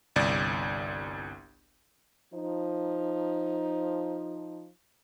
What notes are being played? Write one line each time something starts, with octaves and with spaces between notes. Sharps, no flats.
G1 C2 D5
F3 D#4